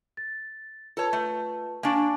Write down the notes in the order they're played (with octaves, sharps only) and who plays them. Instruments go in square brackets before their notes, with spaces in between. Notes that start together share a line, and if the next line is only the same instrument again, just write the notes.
[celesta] A6
[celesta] F4 B4 A5 [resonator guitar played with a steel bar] A4 C#5
[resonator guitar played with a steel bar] A3
[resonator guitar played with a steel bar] A#3 D4 [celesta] G#5 A5 C#6